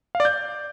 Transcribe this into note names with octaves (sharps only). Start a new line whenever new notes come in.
F5
D5
G6